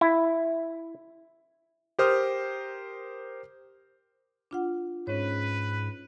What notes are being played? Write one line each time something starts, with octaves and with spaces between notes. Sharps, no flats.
E4
G4 A#4 C5 D#6 F6
D4 F4 F#5
G#2 C#4 B4 C#5